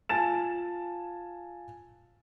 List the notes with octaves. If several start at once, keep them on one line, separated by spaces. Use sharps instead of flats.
F4 G#5 A5 A6 E7